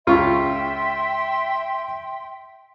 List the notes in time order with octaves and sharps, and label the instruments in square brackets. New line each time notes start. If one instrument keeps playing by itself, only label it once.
[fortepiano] C#2 F4 C#6 [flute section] E5 G5 C6